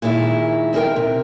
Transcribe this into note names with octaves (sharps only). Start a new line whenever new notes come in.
A#2 D#3 G#3 E4
F2 C4 D#4 A#4 G5
C3